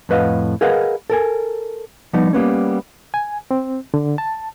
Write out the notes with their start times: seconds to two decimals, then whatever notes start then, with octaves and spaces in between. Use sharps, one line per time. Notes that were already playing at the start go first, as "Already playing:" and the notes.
0.09 F2 A2 B4 D#5 F5 F#5
0.61 G#4 A#4 B4 D#5 F5 F#5
1.10 A4 A#4 G#5
2.13 F3 G3 B3 D#4
2.33 G3 A#3 B3 C#4
3.14 G#5
3.51 C4
3.94 D3
4.18 A5